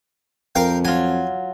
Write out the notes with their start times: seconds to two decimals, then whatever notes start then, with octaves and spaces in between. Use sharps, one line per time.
0.55 F2 A#4 F5 G5
0.85 F#3 F4 G#5